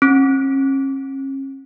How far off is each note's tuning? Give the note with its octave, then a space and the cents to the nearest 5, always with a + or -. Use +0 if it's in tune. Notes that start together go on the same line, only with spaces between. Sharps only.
C#4 -40